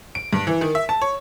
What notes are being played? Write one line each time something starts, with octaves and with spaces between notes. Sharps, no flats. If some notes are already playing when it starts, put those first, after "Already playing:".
D7
G2
E3
D#3
E5
A5
C#5